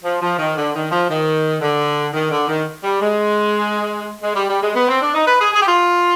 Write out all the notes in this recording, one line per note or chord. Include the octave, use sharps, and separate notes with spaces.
F3
F3
D#3
D3
D#3
F3
D#3
D3
D#3
D3
D#3
G3
G#3
G#3
G3
G3
G#3
B3
C4
D4
D#4
B4
G#4
G#4
G4
F4